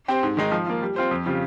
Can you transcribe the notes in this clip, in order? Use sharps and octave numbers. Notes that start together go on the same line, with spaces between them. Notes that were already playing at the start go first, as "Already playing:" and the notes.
C4 G4 C5
G#2
D#3 G#3 D#4
F3
A#3 F4
G3
C4 F4 C5
F2
C#3 G3 C4 F4